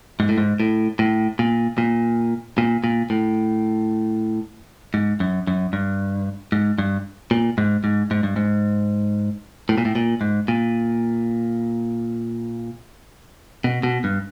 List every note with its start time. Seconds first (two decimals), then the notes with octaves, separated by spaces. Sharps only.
0.20 G#2
0.29 A2
0.38 G#2
0.60 A2
0.99 A2
1.39 A#2
1.78 A#2
2.58 A#2
2.84 A#2
3.10 A2
4.94 G#2
5.20 F#2
5.47 F#2
5.73 G2
6.52 G#2
6.78 G2
7.31 A#2
7.58 G#2
7.84 G#2
8.11 G#2
8.23 G2
8.36 G#2
9.69 A2
9.78 A#2
9.85 A2
9.95 A#2
10.21 G#2
10.48 A#2
13.64 B2
13.83 B2
14.04 G2